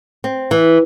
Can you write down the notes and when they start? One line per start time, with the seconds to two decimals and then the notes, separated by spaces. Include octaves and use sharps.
0.24 C4
0.51 E3